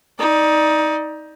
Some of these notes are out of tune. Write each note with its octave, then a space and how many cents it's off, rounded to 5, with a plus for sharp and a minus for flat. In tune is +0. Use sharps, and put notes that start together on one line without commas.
D#4 +20 D5 +20